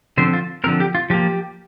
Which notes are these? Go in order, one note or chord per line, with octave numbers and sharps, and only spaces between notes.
D3 F3 C4 C5
F4
D3 F3 C4 A#4
G4
F4
F3 A#3 G4